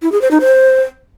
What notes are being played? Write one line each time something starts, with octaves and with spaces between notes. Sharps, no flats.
E4
G#4
C5
D#4
C5